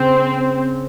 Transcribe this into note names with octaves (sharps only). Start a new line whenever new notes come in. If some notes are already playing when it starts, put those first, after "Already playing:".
Already playing: C#3 C4